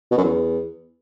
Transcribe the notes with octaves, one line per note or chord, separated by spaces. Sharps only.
B2
F#2
E2